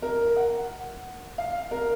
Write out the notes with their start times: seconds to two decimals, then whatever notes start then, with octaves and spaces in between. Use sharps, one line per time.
0.02 A#4
0.36 F#5
1.38 F5
1.71 A#4